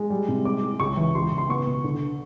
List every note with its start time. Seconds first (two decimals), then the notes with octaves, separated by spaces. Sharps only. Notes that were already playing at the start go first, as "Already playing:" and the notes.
Already playing: G#3
0.10 G3
0.28 C3
0.45 G#3 D6
0.63 G#3
0.80 C#2 C#6
0.97 E3
1.15 C#2 C6
1.32 C#2
1.38 C6
1.49 B3 C#6
1.67 B2
1.84 D3